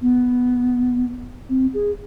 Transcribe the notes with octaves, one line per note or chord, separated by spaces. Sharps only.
B3
C4
G#4